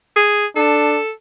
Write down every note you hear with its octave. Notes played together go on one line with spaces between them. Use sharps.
G#4
D4 A4